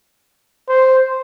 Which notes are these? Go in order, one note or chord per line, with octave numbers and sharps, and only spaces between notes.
C5